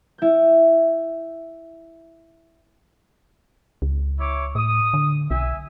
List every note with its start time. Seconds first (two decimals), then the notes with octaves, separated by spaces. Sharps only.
0.18 E4 G6
3.82 C#2
4.19 E4 C#5 D6
4.55 A2 D#6
4.94 D3
5.31 B1 E5 G#5